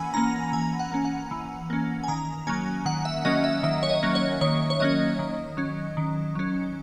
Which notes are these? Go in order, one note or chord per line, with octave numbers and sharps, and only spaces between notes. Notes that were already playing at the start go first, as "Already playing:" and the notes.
Already playing: E3 A#3 C#4 F#5 G#5 B5
A#3 C#4 A#5
E3 G#5
F#5
A#3 C#4
F#5
E3
A#3 C#4
G#5
D#3 A#5
F#3 A#3 C#4 G#5
D#3 F#5
E5
F#3 A#3 C#4 D#5
E5
D#3 E5
C#5
D#5
F#3 A#3 C#4
C#5
D#3 C#5
C#5
F#3 A#3 C#4 D#5
D#3
F#3 C#4
D#3
F#3 C#4